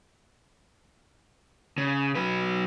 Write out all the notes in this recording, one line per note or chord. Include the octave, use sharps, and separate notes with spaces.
C#3
F#3 B4